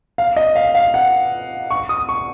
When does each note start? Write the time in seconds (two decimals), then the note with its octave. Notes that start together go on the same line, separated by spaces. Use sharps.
0.18 F5
0.36 D#5
0.56 F5
0.75 F5
0.94 F#5
1.71 C#6
1.89 D#6
2.09 C#6